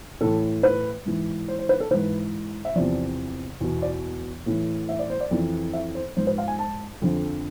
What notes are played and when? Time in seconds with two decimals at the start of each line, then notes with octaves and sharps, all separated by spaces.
0.21 A2 E3 A4
0.63 B4
1.06 G#2 E3
1.48 C5
1.59 C5
1.69 B4
1.80 A4
1.91 G#2 E3 B4
2.65 E5
2.75 E2 C3 F3 D5
3.61 E2 B2
3.82 D5
4.46 A2 E3
4.89 E5
4.99 D5
5.10 C5
5.21 D5
5.31 F2 E3
5.73 E5
5.95 C5
6.16 G#2 F3 C5
6.27 B4
6.38 F5
6.48 G#5
6.59 A5
7.02 F2 D3 F3